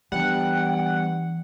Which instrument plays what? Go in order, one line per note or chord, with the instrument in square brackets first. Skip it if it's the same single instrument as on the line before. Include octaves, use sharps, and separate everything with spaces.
[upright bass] E3 [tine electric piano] G3 B3 D4 [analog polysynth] F#5 [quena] G5